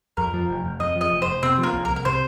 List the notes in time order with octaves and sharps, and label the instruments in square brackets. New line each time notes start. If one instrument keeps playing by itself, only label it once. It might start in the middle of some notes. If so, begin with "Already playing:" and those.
[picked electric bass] F2 [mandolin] A#4
[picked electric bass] F3
F1
F1
[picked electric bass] F2 [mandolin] D#5
[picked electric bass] F3 [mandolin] D#5
[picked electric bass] F1
[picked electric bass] F1 [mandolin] C5
[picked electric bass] C3 [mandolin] C4
[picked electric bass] F3
[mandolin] A#3
[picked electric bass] C2
[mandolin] A#4
[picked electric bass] C2
[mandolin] A#4
[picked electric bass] C3 [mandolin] C5